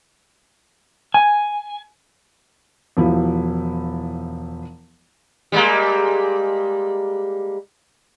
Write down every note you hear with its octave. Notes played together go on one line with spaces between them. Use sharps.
G#5
E1 F3 E4
G3 G#3 A#3